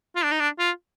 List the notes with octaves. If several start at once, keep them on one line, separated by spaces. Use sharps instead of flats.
F4
D4
D#4
D4
F4